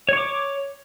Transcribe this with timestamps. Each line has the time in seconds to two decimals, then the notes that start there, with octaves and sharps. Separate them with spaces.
0.09 C#5
0.13 C#6
0.17 D6